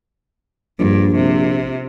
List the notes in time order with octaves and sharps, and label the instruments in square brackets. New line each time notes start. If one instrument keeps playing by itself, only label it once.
[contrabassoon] A#1 [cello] G2
[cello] C3